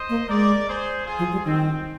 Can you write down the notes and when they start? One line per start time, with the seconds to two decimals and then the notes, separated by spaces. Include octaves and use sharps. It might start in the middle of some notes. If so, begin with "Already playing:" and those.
Already playing: C5 D#5
0.09 A#3
0.28 G#3 A#4 D5
0.67 G#4 C5
1.06 F4 G#4
1.19 F3
1.32 G3
1.45 D#3 C4